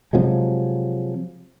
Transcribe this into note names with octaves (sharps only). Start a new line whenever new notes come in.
C3 F3 F#3 G#3